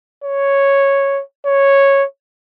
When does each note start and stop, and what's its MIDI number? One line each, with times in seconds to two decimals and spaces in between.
0.24 1.22 73
1.46 2.04 73